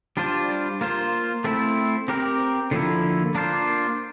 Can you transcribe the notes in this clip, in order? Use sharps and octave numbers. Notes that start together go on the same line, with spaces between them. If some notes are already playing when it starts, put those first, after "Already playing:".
G3 D4 F4 C5
A#3 F4 C5
A3 C4 E4
C4 G4 A#4
D3 F3 A#3 E4
A#3 D4 F4 C5